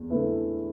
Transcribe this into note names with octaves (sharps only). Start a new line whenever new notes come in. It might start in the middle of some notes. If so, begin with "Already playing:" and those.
Already playing: E2
D3 A3 E4 B4